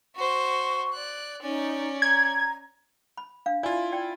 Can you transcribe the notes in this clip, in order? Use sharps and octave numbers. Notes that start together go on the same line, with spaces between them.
F#4 C5 C#6
D5 F#6
C#4 D#4 D5
A#5 G#6
B5
D4 F5
E4 F4 D5 G#5
D5 G5